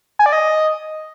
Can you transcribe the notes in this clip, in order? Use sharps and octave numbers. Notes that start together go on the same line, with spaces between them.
G#5
D5
D#5